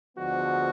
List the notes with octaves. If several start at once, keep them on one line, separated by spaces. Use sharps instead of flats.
D2 D3 F3 G#3 B3 F#4